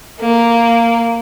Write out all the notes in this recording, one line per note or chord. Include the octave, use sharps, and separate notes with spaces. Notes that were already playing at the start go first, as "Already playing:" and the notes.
A#3